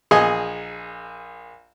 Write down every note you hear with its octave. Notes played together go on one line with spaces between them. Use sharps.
A#1 G#4 D#5 G#5